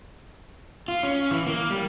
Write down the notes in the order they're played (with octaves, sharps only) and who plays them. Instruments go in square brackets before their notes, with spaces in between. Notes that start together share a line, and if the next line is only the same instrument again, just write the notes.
[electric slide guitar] F4
C#4
E3
A#3
G3